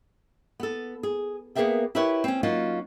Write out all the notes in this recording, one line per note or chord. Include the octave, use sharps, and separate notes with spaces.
B3 A4
G#4
A#3 B3 G#4 A#4 E5 G5
E4 G4 A#4 B4 C#5 E5
C4 C#4
F#3 A#3 C#4 D#4 F4 F#4